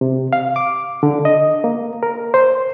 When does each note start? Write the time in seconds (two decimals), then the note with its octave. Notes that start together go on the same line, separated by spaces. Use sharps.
0.01 C3
0.33 F5
0.56 D6
1.03 D3
1.25 D#5
1.64 A#3
2.03 A#4
2.34 C5